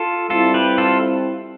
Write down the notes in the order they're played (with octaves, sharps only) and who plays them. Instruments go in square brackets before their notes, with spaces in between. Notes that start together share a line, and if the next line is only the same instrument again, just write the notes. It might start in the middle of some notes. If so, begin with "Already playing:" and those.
Already playing: [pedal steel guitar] F4 A4
[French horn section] G3 C4 E4 [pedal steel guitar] F4 A4
[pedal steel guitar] G4 B4
F4 A4